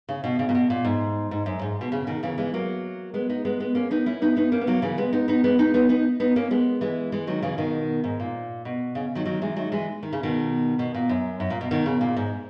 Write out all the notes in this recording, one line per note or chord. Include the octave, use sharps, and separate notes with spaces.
C#3
B2
C#3
A#2
B2
A#2
G#2
G#2
F#2
G#2
B2
C#3
B2 D#3
C#3 E3
E3 G#3
F#3 A#3
G#3 B3
B3 D#4
G#3 B3
G#3 B3
A#3 C#4
B3 D#4
C#4 E4
B3 D#4
B3 D#4
A#3 C#4
B3
F#3 A#3
C#3 E3
G#3 B3
B3 D#4
B3 D#4
G#3 B3
B3 D#4
B3 D#4
B3 D#4
B3 D#4
A#3 C#4
G#3 B3
E3 G#3
E3 G#3
D#3 F#3
C#3 E3
B2 D#3
G#2
A#2
B2
C#3
D#3 F#3
D#3 F#3
E3 G#3
D#3 F#3
E3 G#3
D#3
C#3
B2 D#3
B2
A#2
F#2
F#2
A#2
B2
B2 D#3
C#3
A#2
G#2